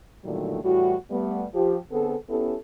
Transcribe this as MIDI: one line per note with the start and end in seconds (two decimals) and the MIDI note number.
0.25 0.58 46
0.25 0.58 50
0.25 0.58 51
0.25 0.58 54
0.25 0.58 55
0.25 0.58 57
0.64 0.94 45
0.64 0.94 52
0.64 0.94 55
0.64 0.94 66
1.10 1.45 55
1.10 1.45 57
1.10 1.45 59
1.54 1.77 53
1.54 1.77 67
1.91 2.15 50
1.91 2.15 59
1.91 2.15 60
1.91 2.15 68
1.91 2.15 69
2.29 2.55 59
2.29 2.55 61
2.29 2.55 64
2.29 2.55 67
2.29 2.55 69